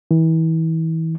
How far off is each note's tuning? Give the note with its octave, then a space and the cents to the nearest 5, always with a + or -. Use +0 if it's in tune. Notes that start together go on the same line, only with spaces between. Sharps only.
E3 -30